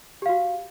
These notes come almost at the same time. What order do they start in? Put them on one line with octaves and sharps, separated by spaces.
G4 F5 F#4